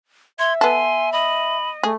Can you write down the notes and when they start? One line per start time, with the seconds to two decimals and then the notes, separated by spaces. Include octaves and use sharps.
0.39 E5 C6 G#6
0.61 B3 A4 G#5 C6
1.12 D#5 B5
1.83 A3 G#4